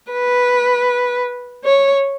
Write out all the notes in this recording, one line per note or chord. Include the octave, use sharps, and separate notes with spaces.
B4
C#5